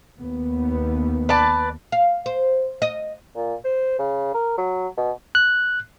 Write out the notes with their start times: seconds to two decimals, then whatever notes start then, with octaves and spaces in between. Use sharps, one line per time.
0.19 D#2 B3
1.29 B4 D5 A5
1.92 F5
2.26 C5
2.82 D#5
3.36 A#2
3.64 C5
3.99 C#3
4.34 A#4
4.58 F#3
4.97 B2
5.35 F#6